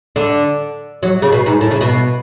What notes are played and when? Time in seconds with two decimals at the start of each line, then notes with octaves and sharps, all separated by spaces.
0.16 D3
1.03 F#3
1.22 C#3
1.32 B2
1.46 G#2
1.61 A2
1.71 C#3
1.81 B2